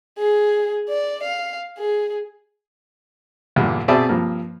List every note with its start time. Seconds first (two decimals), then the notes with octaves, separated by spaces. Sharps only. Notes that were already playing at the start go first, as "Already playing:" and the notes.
0.19 G#4
0.89 D5
1.23 F5
1.78 G#4
3.56 E2 G2 A#2 D3
3.88 B2 C4 G#4 D5 E5 A5
4.09 G2 F3 A#3